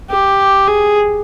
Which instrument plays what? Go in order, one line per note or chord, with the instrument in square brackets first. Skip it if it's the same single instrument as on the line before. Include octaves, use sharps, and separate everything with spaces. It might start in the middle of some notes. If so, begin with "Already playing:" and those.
[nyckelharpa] G4
G#4